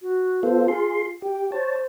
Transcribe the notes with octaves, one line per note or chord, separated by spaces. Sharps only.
F#4
B3 F4 A4 C5
F4 G#4 C6
G4 G5
C5 C#5 A5